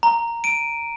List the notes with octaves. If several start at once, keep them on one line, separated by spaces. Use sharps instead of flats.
A#5
D7 D#7